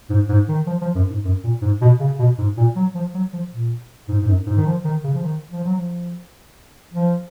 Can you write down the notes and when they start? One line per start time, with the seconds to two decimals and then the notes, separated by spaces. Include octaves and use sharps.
0.10 G#2
0.29 G#2
0.49 D#3
0.67 F3
0.81 F3
0.95 F#2
1.09 G#2
1.24 F#2
1.44 A#2
1.61 G#2
1.81 B2
2.00 C#3
2.19 B2
2.38 G#2
2.57 A#2
2.76 F#3
2.95 F3
3.14 F#3
3.33 F3
3.52 A#2
4.08 G#2
4.22 G#2
4.28 F#2
4.46 G#2
4.57 D#3
4.66 F3
4.84 D#3
5.04 C#3
5.14 F3
5.22 D#3
5.52 F3
5.64 F#3
5.75 F3
6.93 F3